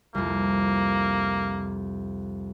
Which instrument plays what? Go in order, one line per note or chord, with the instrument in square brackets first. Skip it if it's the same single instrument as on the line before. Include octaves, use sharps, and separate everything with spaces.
[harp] C2 F2 [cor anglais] A#3